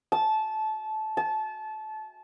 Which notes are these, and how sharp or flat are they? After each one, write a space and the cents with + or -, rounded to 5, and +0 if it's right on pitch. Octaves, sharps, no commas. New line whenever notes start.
A5 -20
A5 -25